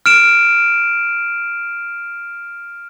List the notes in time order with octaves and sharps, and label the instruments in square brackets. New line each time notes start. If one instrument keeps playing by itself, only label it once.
[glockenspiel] F6 D7 E7